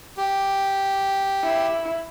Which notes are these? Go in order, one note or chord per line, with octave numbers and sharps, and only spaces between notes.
G4
E4